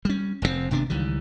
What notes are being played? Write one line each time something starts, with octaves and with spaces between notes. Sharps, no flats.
G3 C#4
F1 F2 A2 C4
G#1 C3 B3 D4
C#2 D#3 E3 G3